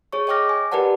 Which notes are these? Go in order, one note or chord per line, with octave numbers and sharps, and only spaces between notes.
G#4 C#5 C#6
C#5 D#5 G5 D6 F6 A#6
G#5
G4 A#4 B4 D5 F#5 A5